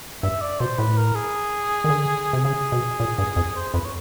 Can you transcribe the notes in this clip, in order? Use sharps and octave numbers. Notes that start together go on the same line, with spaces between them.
G2 E5
D5
B2 C5
A2 B4
A#4
G#4
D#3
D3
C3
C#3 G#4
B2
A#2
G2
F2
C5
F2 B4
C#5